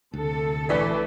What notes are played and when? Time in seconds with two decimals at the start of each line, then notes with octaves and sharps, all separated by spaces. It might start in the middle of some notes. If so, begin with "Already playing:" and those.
0.14 D2 C3 A4
0.69 A#1 E3 A3 B4 D5 B6